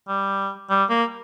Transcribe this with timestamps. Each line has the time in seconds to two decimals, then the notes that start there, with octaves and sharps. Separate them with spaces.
0.08 G3
0.70 G3
0.90 A#3